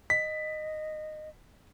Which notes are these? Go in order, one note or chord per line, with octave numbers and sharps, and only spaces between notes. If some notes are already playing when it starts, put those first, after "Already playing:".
D#5 B6